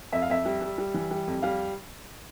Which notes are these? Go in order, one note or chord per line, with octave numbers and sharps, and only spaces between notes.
F2 E5
F5
F2 E5
G3
G3
G3
E3
G3
F2
G3 F5